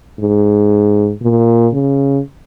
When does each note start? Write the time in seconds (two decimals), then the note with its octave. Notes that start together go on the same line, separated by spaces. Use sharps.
0.20 G#2
1.22 A#2
1.73 C#3